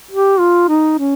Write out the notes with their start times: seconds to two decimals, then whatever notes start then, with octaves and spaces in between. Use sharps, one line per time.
0.11 G4
0.39 F4
0.68 D#4
0.98 C#4